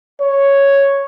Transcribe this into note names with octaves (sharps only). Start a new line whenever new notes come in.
C#5